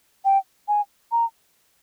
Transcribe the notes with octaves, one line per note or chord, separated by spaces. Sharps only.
G5
G#5
A#5